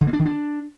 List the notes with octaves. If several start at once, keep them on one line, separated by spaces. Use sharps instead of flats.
D3
A#3
D4
D#3
D4